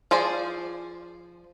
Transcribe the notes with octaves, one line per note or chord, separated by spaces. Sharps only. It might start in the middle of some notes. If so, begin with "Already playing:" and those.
F3 G#4 C5 D5